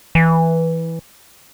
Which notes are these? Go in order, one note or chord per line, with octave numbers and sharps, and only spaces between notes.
E3